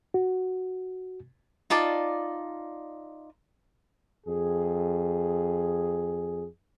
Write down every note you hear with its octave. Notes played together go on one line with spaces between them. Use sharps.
F#4
D#4 F4 D5 A5
F2 G#4